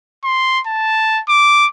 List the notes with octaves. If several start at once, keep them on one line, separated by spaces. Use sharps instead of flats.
C6
A5
D6